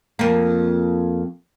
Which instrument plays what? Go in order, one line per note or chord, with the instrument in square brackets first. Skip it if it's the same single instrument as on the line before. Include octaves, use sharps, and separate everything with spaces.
[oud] F2 A#3